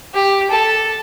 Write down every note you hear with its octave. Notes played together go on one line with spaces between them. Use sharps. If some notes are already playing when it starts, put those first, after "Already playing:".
G4
A4